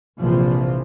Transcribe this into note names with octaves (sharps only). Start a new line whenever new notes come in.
A#1 C3 E3 F3